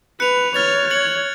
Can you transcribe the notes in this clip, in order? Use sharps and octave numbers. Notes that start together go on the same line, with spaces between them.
B4 F#6 C#7 F7
C#5 F6 A6 F7
G#6 C#7 F#7